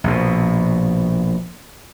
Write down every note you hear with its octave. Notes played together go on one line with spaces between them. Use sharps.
A#1 B2